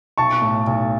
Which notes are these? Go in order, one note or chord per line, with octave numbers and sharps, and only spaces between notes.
B1 A5 C#6
A2
B1